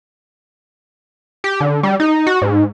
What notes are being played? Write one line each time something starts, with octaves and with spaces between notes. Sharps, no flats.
G4
D3
G3
D#4
F#4
G#2